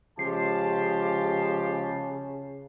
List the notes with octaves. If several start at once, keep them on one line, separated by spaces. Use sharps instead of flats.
C#3 F3 G#3 G4 A5 C7